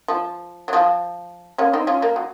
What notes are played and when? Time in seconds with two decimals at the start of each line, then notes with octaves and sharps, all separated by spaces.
0.08 F3
0.68 F#3
0.73 F3
1.58 A#3 C#4
1.73 C4 D#4
1.87 C#4 F4
2.02 A#3
2.16 F#3